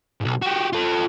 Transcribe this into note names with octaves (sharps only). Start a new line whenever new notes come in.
B1 G#2
F#4 G4
F4 A4